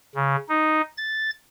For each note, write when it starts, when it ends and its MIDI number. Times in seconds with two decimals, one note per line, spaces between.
0.15 0.36 49
0.49 0.81 63
0.98 1.31 93